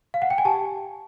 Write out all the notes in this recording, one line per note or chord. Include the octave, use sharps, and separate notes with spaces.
F5
F#5
G5
G#5
G4 A5